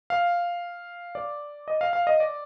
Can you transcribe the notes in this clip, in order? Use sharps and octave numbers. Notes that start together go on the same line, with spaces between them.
F5
D5
D#5
F5
F5
D#5
D5